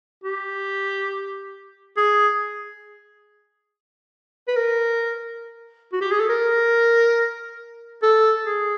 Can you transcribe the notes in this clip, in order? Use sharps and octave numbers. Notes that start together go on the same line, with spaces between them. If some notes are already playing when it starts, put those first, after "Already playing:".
G4
G#4
B4
A#4
F#4
G4
G#4
A4
A#4
A4
G#4